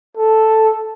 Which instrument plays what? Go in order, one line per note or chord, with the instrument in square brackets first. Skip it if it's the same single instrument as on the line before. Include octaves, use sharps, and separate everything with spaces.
[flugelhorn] A4